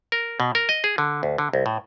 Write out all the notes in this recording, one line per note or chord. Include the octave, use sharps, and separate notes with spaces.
A#4
B2
A#4
D#5
G#4
D3
D2
D3
C2
A2